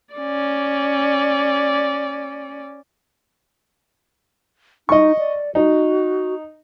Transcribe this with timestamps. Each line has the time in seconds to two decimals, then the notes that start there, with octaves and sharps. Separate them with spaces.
0.14 C#4 D5
4.89 D#4 D#5 C#6
5.19 D5
5.55 D#4 F#4